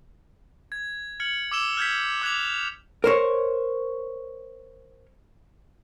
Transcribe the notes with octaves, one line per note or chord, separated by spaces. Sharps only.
G#6
F6 G#6 C#7 F#7
D6 E6 E7 G7
F6 G6 G#6 B6
D6 F#6 G#6 B6 F7
A#4 C5 C#5